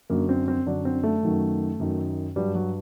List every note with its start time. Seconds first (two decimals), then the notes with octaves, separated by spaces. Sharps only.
0.10 F#2 D3 F#3 A#3
0.29 C4
0.48 C4
0.66 F#2 D3 F#3 D4
0.85 C4
1.03 A3
1.23 F#2 D#3 F#3
1.79 F#2 D#3 F#3
2.36 G2 F#3 G3
2.55 F#3